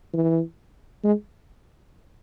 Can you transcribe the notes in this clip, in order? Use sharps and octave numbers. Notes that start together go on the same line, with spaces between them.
E3
G#3